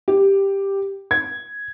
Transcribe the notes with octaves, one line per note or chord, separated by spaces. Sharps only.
G4
G#6